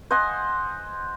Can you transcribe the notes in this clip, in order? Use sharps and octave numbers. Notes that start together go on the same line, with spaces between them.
C5 D#5 F#5 G#5